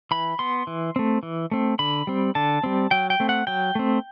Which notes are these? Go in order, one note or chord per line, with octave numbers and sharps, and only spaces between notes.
E3 B5
B3 C6
E3
A3 C4
E3
A3 C4
D3 B5
G3 C4
D3 A5
G3 C4
F#3 G5
G5
A3 C4
F#5
F#3 G5
A3 C4